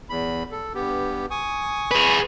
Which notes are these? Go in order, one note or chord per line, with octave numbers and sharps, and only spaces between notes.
E2 B5
A4
G2 B3 G4
G#5 C#6 D#6
G#4 B4